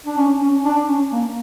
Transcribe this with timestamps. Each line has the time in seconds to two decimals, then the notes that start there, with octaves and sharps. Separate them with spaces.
0.06 D4
0.17 C#4
0.41 C#4
0.65 D4
0.88 C#4
1.12 A#3